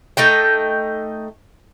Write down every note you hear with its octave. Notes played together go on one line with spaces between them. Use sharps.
A3 D#4 D#5 G5